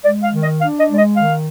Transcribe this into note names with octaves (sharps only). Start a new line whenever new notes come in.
G#3 D5
F5
D#3
D#5
D4 F5
D#5
G#3 D5
D#5
D#3 F5